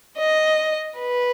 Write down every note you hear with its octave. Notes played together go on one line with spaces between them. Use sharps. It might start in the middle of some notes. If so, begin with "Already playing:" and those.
D#5
B4